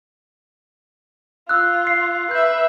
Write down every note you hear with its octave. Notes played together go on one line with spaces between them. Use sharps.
F4 E6 F#6
C7
B4 E5 G6